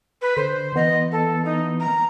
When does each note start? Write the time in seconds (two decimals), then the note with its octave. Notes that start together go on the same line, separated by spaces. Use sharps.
0.22 B4
0.37 D3 C5
0.76 E3 B3 D#5
1.12 A4
1.45 D#4
1.80 A#5